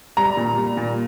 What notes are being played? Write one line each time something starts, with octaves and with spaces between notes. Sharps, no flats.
G3 A#5
A#2
G3
A#2